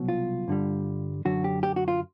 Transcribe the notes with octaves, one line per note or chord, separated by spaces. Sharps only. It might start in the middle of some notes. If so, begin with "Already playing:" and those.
Already playing: C2 B2 F#3
F4
G2 D3 G3
F#2 D3 F#3 F#4
G4
G4
F#4
F4